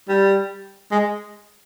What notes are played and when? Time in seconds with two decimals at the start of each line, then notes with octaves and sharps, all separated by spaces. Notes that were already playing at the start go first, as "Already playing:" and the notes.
0.09 G3
0.91 G#3